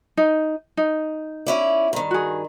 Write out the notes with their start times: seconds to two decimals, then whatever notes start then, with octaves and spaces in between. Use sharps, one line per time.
0.17 D#4
0.77 D#4
1.46 C#4 E4 D5
1.93 G2 D#3
2.11 F#4 G#4